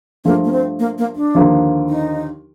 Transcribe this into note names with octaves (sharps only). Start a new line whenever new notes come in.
G2 F3 A3 A#3
A#3
C4
A#3
A#3
D4
D#2 D3 F3 A#3
D#4